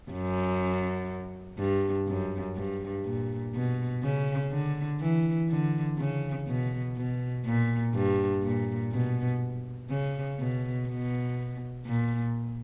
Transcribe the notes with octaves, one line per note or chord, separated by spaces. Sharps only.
F#2
G2
F#2
G2
A#2
B2
C#3
D3
E3
D3
C#3
B2
B2
A#2
G2
A#2
B2
C#3
B2
B2
A#2